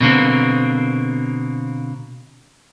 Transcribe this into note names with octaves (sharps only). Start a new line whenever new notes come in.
B2 D3 A#3 C4